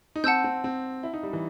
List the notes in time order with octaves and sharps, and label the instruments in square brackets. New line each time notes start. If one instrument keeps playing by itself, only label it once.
[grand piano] D#4
[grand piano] C4 [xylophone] F#5 A5 E6 G6
[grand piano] C4
C4
E4
D#4
G3
E3